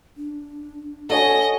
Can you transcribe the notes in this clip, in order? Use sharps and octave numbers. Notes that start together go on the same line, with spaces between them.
D4
F#4 A4 C#5 D#5 G#5